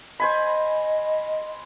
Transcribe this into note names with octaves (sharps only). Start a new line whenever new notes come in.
C5 D#5 G#5 B5